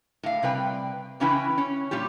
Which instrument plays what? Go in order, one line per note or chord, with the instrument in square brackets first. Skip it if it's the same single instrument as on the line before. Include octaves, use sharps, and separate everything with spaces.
[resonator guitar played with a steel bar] A2 F5
C3 G3 B4 G5
C#3 E3 C#4 E4 B4 G5
C#4
A#2 G3 F4 G4